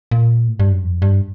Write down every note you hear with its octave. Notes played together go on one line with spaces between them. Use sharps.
A#2
A2
G2
F#2
F2
G2